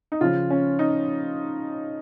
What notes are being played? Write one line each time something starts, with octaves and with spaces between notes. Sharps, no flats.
D#4
C#3 F3 F4
C#4
D#4